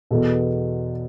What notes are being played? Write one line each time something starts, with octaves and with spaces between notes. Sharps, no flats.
E2 B2 A4